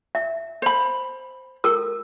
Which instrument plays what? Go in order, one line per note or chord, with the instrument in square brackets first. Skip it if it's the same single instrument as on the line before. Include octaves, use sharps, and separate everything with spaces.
[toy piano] E5
[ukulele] C5 B5
[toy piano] A4 A#4 E6